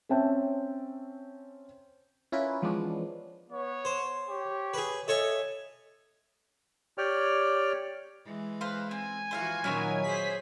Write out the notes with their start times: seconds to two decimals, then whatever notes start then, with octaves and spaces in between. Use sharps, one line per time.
0.09 C4 C#4 E5 G5 A5
2.32 C#4 E4 F4 A#4 B4
2.62 E3 F3 G#3 B3 C#4 D4
3.50 B3 C#5
3.85 C5
4.29 G4 C#5
4.74 G#4 B4
5.08 A4 C#5 D#5 E5 G#5
6.98 G4 C#5 D5 G5 F6
8.25 E3 G#3
8.61 B4 C5 F5
8.91 C4 G#5
9.31 E3 F3 F#4 C5 E5 F5
9.64 A#2 D#3 F#3 C#4 E4 C#5
10.03 G#4 C5 B6